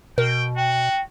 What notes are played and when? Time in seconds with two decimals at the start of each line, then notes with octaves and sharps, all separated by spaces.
0.18 B2 A#4 G5
0.57 F#4 G5